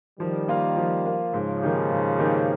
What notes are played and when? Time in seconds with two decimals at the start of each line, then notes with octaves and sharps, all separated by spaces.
0.19 D#3 F3 G3
0.48 A#3 F4
0.77 F3
1.05 A#3 F4
1.33 G#2 C#3 F3
1.62 D#3 A#3 D#4 G4
1.91 G#2
2.18 D#3 A#3 D#4 G4